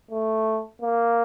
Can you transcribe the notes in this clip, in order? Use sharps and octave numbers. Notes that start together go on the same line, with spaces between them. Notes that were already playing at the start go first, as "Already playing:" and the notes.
A3
A#3